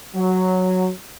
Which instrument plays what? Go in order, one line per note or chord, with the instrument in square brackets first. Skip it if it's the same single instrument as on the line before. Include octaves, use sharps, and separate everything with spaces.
[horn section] F#3